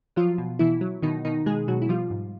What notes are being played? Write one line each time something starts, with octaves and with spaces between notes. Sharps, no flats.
F3 F#3 F4
B2
B2 E3 E4
F#3
B2 D#3 D#4
B2 D#3 D#4
B2 G#3 G#4
B2 F#3 F#4
E4
F3 G3 F4
G#2